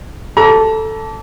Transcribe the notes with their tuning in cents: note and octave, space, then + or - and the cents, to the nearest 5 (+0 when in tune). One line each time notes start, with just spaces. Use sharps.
A4 +0 A#5 +30 D6 -25